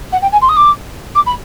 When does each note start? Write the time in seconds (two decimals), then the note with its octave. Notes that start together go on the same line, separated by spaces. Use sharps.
0.12 F#5
0.22 G5
0.32 G#5
0.41 C6
0.49 D#6
0.56 D6
1.15 D6
1.26 B5